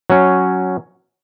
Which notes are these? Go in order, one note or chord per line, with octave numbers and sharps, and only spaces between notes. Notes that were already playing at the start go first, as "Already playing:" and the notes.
F#3 C#4